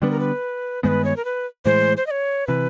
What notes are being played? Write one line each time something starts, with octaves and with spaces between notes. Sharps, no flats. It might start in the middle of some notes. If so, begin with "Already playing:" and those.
D3 G3 B3 D4 B4
A#4
B4
G2 D#3 G#3 B3 B4 C5
C#5
A#4
B4
A2 E3 G#3 C5
C5
D#5
C#5
C3 E3 B4